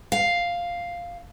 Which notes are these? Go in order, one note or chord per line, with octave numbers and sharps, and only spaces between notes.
F5